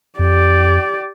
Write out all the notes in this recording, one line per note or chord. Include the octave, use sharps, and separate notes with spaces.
F2 G4 D5